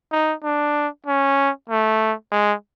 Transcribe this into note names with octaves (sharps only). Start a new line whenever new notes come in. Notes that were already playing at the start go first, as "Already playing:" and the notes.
D#4
D4
C#4
A3
G#3